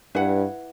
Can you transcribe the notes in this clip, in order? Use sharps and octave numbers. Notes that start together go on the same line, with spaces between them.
G2 E4 B4 F#5